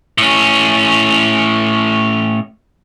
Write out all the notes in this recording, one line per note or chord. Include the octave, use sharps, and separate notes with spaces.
A2 C#4